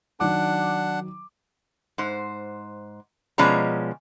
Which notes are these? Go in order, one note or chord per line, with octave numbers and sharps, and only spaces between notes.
D#3 F#3 D4 F#5 D6
G#2 C5
B2 F3 G#3 C#4 D5 A#5